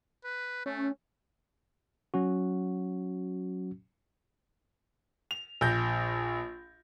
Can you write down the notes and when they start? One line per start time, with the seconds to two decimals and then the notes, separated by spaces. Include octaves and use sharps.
0.24 B4
0.66 A3 C#4
2.14 F#3 C#4 F#4
5.31 F7
5.61 A#1 G6 A#6